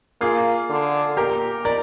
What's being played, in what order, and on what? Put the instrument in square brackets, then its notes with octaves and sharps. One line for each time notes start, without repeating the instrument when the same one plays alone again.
[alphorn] A#3 [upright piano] F4 G#4
[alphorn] D3
[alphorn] A#2 [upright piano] G4 A#4
[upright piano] A#4 D5